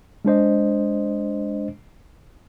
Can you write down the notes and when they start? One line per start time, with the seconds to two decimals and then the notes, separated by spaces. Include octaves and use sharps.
0.25 G#3 D4 C5 D#5